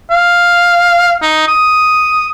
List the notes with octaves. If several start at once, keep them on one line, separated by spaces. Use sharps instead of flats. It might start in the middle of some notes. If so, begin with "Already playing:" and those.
F5
D#4
D#6